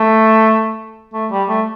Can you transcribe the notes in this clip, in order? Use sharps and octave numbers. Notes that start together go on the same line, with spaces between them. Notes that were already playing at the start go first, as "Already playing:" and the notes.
Already playing: A3
A3
G3
A3